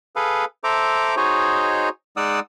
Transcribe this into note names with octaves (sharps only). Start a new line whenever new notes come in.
G#4 A4 B4 F5
A4 C5 E5 A#5 D6
D#4 F#4 G#4 C5 C#5 D#5
G#3 D#4 D5 F#5 D#6 E6